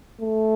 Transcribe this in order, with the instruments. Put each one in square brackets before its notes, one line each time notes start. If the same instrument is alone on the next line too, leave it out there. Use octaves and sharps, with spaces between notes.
[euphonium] A3